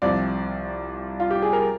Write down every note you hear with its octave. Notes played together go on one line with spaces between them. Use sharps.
C2 C3 F3 D5
F4
G4
G#4
A#4